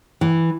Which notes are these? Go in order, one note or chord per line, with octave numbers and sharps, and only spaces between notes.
E3